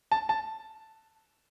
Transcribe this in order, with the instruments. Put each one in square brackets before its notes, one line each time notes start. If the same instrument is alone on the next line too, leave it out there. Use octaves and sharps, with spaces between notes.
[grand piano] A5
A5